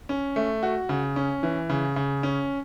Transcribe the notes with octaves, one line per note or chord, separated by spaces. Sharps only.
C#4
A3
F#4
C#3
C#4
E3
C#3
C#3
C#4